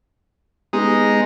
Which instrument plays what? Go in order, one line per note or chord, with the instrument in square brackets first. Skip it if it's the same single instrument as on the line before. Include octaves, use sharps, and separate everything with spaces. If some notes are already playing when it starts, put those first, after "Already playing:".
[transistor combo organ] G#3 D#4 [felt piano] B3 G4